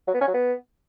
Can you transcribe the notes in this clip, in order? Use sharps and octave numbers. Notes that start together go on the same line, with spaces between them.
F#3
B3
C#4
F#3
B3